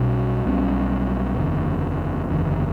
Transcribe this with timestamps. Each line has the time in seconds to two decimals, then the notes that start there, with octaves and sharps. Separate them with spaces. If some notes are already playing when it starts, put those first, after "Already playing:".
Already playing: B1 B2 G3 C#4
0.46 B1 B2 G3 C#4
1.38 F#1 E2 D3
2.30 F#1 E2 D3